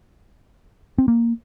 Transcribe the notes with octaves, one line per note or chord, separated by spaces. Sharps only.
C4
A#3